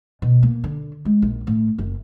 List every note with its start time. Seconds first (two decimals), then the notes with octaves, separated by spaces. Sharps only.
0.22 B2
0.43 A#3
0.64 D3
1.05 G#3
1.22 A#1
1.47 A2
1.78 F#1